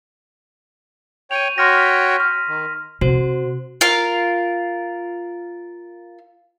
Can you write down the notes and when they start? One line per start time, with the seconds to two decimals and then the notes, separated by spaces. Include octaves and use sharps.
1.31 C#5 G5 D#7 F7
1.58 F#4 C#5 G5 C6 F6 A#6
1.73 F6 B6
2.20 F6
2.48 D#3
3.01 C3 F#4 C5
3.81 F4 A#4 F5